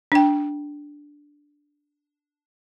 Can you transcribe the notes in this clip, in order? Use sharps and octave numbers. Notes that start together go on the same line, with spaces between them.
D4 G5